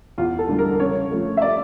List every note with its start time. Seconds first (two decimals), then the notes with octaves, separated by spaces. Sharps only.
0.18 E2 F4
0.39 A4
0.49 D3 G3
0.59 A#4
0.80 C#3 C#5
1.11 F3 A3
1.37 E5
1.42 D5